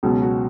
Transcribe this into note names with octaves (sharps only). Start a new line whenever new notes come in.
C#2 B2 F#3
F#4